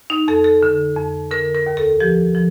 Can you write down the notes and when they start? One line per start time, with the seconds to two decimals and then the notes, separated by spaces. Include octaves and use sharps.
0.10 D#4
0.28 F2 A4
0.44 A4
0.63 D3
0.97 F2
1.31 D3 A#4
1.55 A#4
1.66 D#2
1.77 A4
2.00 F3 G4
2.35 F3